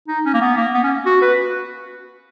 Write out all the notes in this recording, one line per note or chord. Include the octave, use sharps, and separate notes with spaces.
D#4
C#4
A#3
B3
A#3
B3
C#4
F#4
B4